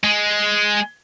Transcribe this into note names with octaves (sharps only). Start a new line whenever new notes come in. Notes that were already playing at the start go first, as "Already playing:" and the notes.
G#3